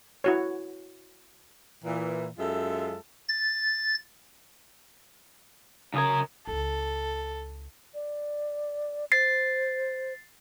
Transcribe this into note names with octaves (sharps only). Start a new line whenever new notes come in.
E4 F#4 C#5
A#2 E3
F#2 G#3 F4 A4 E5
A6
F#2 C#3 A#4 D#6 G#6
C#2 E4 A4
D5
C5 A6 C7